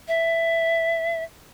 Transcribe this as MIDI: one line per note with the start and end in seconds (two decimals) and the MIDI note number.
0.08 1.24 76